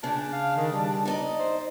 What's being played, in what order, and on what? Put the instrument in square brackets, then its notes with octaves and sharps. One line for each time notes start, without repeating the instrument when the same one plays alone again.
[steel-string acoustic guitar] C#3 [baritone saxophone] D4
[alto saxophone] F5
D#3
G3
[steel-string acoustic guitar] D#4 D5 D#5
[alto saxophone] C5